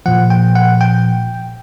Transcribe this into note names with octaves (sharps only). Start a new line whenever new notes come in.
A#2 F3 F#5
G5
F#5
G5